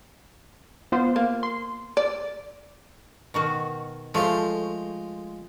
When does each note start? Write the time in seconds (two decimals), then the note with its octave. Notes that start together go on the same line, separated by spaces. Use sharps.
0.92 B3 F4 C5
1.16 A#3
1.43 C6
1.97 D5
3.34 B2 D#3 F#4
4.14 F3 G#3 A3 F4 C5